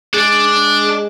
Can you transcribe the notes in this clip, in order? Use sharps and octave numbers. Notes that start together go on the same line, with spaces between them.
G#3 D4